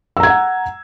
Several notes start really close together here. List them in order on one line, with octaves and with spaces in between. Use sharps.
E6 A#5 G#6 F#5